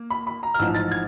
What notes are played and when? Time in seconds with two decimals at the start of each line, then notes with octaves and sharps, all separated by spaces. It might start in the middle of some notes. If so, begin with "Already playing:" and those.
Already playing: A#3
0.10 B5
0.27 B5
0.43 A#5
0.54 F6
0.59 A1 G#2 F3 E6
0.75 A6
0.91 G#6